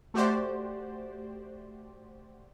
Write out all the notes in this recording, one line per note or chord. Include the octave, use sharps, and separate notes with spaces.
A3 F#4 G4 C5 D5